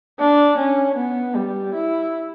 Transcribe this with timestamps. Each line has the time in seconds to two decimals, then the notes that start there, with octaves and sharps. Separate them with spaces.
0.20 D4
0.58 C#4
0.96 B3
1.34 G3
1.74 E4